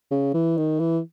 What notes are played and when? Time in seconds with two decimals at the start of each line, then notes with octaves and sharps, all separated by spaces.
0.12 C#3
0.34 E3
0.57 D#3
0.79 E3